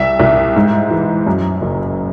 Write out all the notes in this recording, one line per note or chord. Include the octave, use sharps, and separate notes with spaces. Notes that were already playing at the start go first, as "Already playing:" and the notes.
Already playing: C2 E5
C2
G#2
E3
F#2
F#1